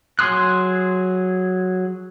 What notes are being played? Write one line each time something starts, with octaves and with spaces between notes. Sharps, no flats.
F#3 G#4 C6 D#6 F#6